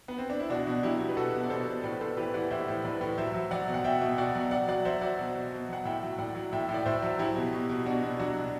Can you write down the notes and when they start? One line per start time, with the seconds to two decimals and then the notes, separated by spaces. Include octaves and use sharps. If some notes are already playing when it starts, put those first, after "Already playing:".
0.08 B3
0.18 C4
0.30 D4
0.39 E4
0.50 B2 D4 F#4
0.67 B2
0.83 F#3 E4 G4
1.00 B2
1.09 B4
1.17 B2 F#4 A4
1.34 B2
1.44 D5
1.50 B2 A4 C5
1.67 B2
1.83 A2 B4 D5
2.01 A2 A4 C5
2.17 E3 G4 B4
2.34 E3 D5 F#5
2.50 A2 C5 E5
2.68 A2
2.84 A2 B4 D5
3.01 A2
3.18 F#3 C5 E5
3.34 F#3
3.51 F#3 D5 F#5
3.68 B2
3.74 F#5
3.84 B2 E5 G5
4.01 B2
4.18 B2 D5 F#5
4.35 F#3
4.51 F#3 D5 F#5
4.68 F#3 D5 F#5
4.85 F#3 C5 E5
5.01 F#3 D5 F#5
5.19 B2
5.35 B2
5.52 B2
5.69 F#3 F#5
5.85 A2 E5 G5
6.03 F#3
6.19 A2 D5 F#5
6.35 F#3
6.53 A2 E5 G5
6.69 A2
6.74 D5
6.85 A2 C5 E5
7.02 F#3
7.19 F#3 E4 G4
7.36 B2
7.53 B2
7.69 B2
7.86 B2 D4 F#4
8.02 B2
8.19 F#3 D4 F#4
8.36 B2